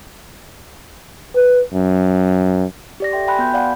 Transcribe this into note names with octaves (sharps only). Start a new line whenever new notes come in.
B4
F#2
G4 D5 A#6
A4 E5 G5 C6
G5 G#5 B5 C6 F#6
B3 F#4 G6
D5 F5 F#5 G#5 B5